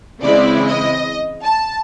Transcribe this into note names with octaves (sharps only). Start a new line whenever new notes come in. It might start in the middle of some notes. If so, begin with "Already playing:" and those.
C#3 E3 G#3 C4 E4 D5
D#5
A5